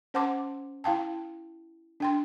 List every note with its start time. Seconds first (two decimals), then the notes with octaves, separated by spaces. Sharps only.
0.14 C#4 C5 F#5 A5 C6 D6
0.84 E4 F5 G5 A5
2.00 D4 G5 C6